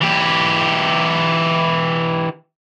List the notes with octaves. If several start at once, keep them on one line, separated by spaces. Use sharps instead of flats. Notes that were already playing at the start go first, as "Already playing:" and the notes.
E3 G4